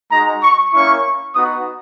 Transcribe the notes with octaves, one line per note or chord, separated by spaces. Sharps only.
G#3 D#4 F#4 A#5
C#6
A#3 C#4 E4 C#6
B3 D#4 F#4 D#6